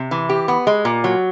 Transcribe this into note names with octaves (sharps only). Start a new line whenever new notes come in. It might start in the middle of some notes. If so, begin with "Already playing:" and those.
Already playing: C3
E3
G4
B3
G#3
A#2
F#3